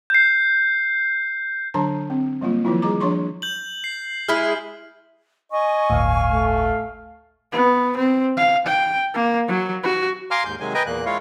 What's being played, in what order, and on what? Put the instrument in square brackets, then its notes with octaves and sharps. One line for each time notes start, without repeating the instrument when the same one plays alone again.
[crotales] G6 C7
[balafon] D3 F#3 D4 A5 A#5
C4
F#3 G3 A#3 F4
D#3 F3 F#3 E4 F4
G3 G#4 A#5 D6
F3 D4 C#5 C6 C#6
[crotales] G6 F#7
C7
[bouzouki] G#3 E4 G#4 [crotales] F6
[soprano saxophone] D#5 [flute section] G#5 C#6
[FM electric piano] G1 D2 A2 [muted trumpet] F5
[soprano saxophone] A3
[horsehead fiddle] B3
C4
F5
G5
A#3
F#3
F#4
[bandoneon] F5 G#5 A#5 C6 D6 F6
D#2 G#2 G6
C3 D#3 F#3 G#3 G#5
B4 D#5 G5 G#5 A#5
E2 A#2 A#3 F#6
G#3 E4 F4 C#5 F5